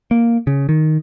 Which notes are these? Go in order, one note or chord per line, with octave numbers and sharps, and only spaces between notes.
A#3
C#3
D#3